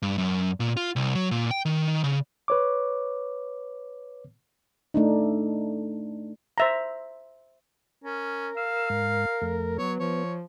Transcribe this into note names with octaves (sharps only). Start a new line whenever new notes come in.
G2
F#2
A#2
F4
C2
F#3
A#2
G5
D#3
C#3
B4 C#5 D6
A3 D4 D#4
C5 E5 A#5
C#4 A#4
F5 E6
G#2
F2 A3
F#3 B3 C#5
F3 C#5